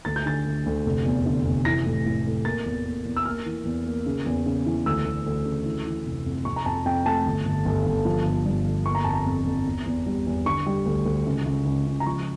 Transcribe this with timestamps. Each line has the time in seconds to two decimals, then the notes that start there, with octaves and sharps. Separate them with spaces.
0.05 D2 A6
0.16 G6
0.26 D3 A6
0.45 D2
0.66 D2
0.86 F1
1.05 E2
1.26 D3
1.46 F1
1.65 E3 A#6
1.86 A2
2.06 A2
2.26 A2
2.45 A#3 A6
2.66 E2
2.86 A#3
3.05 E2
3.16 E6
3.25 A#3 F6
3.46 E3
3.65 E2
3.86 A#3
4.06 C#3
4.26 E2
4.46 C#3
4.66 E3
4.86 D2 E6
5.05 D2
5.26 D2
5.46 C#3
5.65 E3
5.86 E3
6.06 F1
6.26 F2
6.45 F2 C#6
6.56 A#5
6.66 F2 A5
6.85 F2 G5
7.06 A3 A5
7.26 G1
7.45 G1
7.66 G1
7.86 G1
8.05 F3
8.25 G1
8.45 G2
8.66 G1
8.86 A#3 C#6
8.95 A#5
9.04 F2 A5
9.13 A#5
9.26 F2
9.46 F2
9.66 E2
9.86 E2
10.06 G3
10.26 E2
10.46 D3 C#6
10.66 G3
10.86 D2
11.06 D2
11.26 C#2
11.45 C#2
11.66 C#2
11.86 C#2
12.00 A#5
12.06 F3 C#6